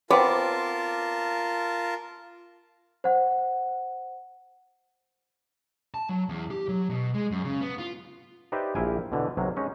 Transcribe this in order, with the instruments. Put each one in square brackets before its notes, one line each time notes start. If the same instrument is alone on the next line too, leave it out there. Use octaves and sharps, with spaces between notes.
[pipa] B3 C4 [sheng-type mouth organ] F4 A#4 A5 [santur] D6
[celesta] C5 F#5
[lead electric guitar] A5
F#3
E2
G4
F#3
B2
G#3
F#2
C#3
B3
F4
[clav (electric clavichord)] D#4 G4 B4 C5 D5 E5
A#1 A#3 E4 F5 G5 G#5
B2 D3 E3
B1 C3 F#3 A#3
G#3 C#4 D#4